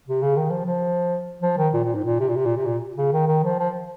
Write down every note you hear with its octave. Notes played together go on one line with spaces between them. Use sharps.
C3
C#3
D#3
F3
F3
F3
D#3
A#2
A#2
G#2
A#2
C3
A#2
C3
A#2
C3
A#2
C#3
D#3
D#3
F3
F3